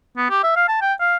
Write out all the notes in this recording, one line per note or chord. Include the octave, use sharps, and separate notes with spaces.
B3
G4
E5
F5
A5
G5
F5